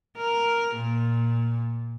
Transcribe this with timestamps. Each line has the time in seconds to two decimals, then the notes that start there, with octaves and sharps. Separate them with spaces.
0.17 A#4
0.75 A#2